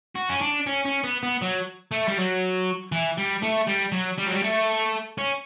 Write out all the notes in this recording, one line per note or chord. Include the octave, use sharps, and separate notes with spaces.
F#4
C#4
D4
C#4
C#4
B3
B3
F#3
A3
G3
F#3
E3
G3
A3
G3
F#3
G3
F#3
G3
A3
C#4